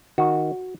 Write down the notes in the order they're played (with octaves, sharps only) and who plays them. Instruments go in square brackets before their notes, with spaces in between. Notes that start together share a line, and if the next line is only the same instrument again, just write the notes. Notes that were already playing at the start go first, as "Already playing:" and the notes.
[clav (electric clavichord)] D#3 F#4